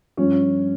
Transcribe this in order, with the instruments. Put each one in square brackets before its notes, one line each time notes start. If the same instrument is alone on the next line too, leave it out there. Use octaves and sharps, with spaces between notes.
[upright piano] G2 F3 C#4